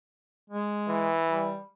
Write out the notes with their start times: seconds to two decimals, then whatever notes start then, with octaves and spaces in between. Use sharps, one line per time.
0.50 G#3
0.89 E3
1.29 G3